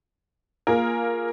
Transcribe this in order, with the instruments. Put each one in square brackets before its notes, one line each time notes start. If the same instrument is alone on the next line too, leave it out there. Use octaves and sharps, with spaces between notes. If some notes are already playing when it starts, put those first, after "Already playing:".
[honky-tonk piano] A#3 F4 G#4 A#4